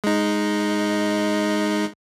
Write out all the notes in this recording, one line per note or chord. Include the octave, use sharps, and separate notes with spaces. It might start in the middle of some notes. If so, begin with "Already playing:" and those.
G#3 D#4